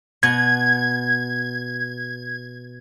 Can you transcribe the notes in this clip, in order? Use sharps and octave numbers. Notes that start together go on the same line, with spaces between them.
B2 G#6